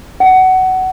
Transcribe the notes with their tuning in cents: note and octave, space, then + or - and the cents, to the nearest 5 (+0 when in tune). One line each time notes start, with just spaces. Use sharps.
F#5 +20